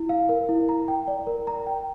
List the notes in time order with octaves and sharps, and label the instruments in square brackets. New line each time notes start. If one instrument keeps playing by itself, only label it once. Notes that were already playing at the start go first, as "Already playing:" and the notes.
Already playing: [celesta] E4
F5
A#4
E4
A#5
G5
D5
A#4
A#5
G5